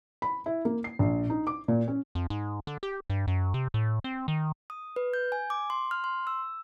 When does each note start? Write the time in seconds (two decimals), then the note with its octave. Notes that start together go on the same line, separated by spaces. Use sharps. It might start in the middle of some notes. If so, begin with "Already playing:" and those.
0.22 B5
0.46 E4
0.65 A#3
0.84 C7
0.99 A#1
1.30 D#4
1.47 D6
1.68 A#2
1.88 C#4
2.15 F2
2.30 G#2
2.67 D3
2.83 G4
3.10 G2
3.28 F#2
3.54 C3
3.74 A2
4.04 C4
4.28 D#3
4.70 D#6
4.96 B4
5.13 G6
5.32 G#5
5.50 D6
5.70 C6
5.91 F6
6.04 C6
6.27 E6